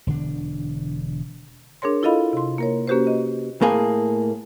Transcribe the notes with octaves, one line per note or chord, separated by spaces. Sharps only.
E1 D3 D4
D4 G#4 A#4 C#5 C6
E4 F4 A4 D#5 F5 B5
C3 C6
A#3 A#4 C#5
A#3 C#4 F#4 G4 B4 C5
D#5
A2 A#3 G#4